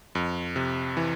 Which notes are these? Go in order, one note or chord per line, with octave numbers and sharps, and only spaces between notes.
F2
C3
E3